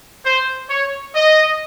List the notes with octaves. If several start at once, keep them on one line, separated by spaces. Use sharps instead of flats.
C5
C#5
D#5